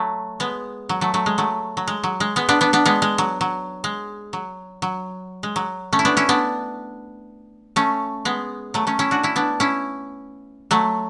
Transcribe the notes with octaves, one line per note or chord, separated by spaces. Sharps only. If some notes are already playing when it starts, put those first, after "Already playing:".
Already playing: F#3 A3
G#3 B3
F#3
F#3 A3
F#3 A3
G#3
F#3 A3
F#3
G#3
F#3
G#3
G#3 B3
B3 D4
B3 D4
B3 D4
G#3 B3
G#3
F#3
F#3
G#3
F#3
F#3
G#3
F#3
A3 C#4
E4
B3 D4
C#4 E4
B3 D4
A3 C#4
G#3 B3
F#3 A3
A3 C#4
C#4 E4
D4 F#4
C#4 E4
B3 D4
C#4 E4
F#3 A3